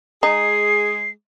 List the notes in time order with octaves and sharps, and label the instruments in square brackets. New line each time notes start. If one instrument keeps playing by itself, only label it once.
[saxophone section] G#3 G#4 [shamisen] D#4 [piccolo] C7